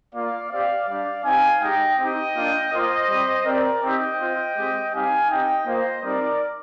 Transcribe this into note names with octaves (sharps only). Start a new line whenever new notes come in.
A#3 F4 D5 F5
C4 G4 D5 F5
G3 D4 G4 D5 F5
C4 D#4 G4 F5 G#5
G#3 D#4 G4 D#5 G5
C4 D#4 G4 D#5 G5
A#3 D4 F4
A#3 F4 C5 D#5
G3 C4 G4
C4 G4 A#4 D5
C4 D#4 G4 D#5 G5
C4 F4
G#3 C4 G4
G3 C4 D#4 G4 F5 G#5
C4 D#4 G4 D#5 G5
A#3 F4 C5 D#5
G3 C4 D#4 A#4 D5